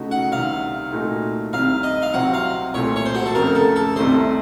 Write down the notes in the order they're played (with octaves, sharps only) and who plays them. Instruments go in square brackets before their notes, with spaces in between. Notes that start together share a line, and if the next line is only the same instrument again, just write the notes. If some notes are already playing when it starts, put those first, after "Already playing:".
Already playing: [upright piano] C#3 A3 D#4 F#4
[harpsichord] F#5
[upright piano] C2 C3 D#3 [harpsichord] F5
[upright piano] A#2 A3 D#4 F#4
[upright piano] C2 C3 D#3 [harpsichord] F5
[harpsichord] D#5
F5
[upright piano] C2 C3 F#3 C4 [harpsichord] F#5
[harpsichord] F5
[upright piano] C2 A#2 A3 [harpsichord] C#5
[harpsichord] C#5
C5
F#4
A4
[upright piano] F2 C#3 A3 [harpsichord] A#4
[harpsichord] A4
A4
[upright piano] C2 C3 D#3 A3 D#4 [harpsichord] C5